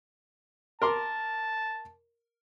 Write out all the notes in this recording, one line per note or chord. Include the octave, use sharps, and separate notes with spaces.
A#4 A5 C6 D6